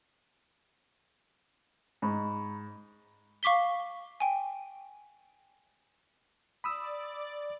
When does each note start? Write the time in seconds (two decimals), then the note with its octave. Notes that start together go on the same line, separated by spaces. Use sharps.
2.02 G#2 A#5 B5 C#6
3.43 F5 C#6 D6 B6 G7
4.20 G5 G#5
6.64 D5 B5 D#6 E6